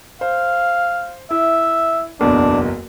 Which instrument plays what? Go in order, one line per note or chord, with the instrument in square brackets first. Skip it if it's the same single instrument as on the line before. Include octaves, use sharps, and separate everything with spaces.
[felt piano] C5 [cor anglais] F5
[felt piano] E4 [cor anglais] E5
[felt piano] F#1 B1 E2 [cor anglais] D4